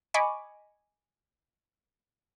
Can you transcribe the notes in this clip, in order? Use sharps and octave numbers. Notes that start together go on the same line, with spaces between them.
D#5 G#5 B5 C#6 D6